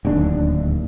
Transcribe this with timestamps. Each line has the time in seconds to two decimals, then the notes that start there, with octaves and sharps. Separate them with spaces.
0.05 D1 D#2 D4